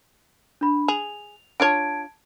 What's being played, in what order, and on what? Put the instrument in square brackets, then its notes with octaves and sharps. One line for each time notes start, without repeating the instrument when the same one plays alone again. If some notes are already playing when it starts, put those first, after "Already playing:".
[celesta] D4 B5
[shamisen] G#4 [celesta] F7
[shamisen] D4 F4 C#5 [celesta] A5 G#6 D7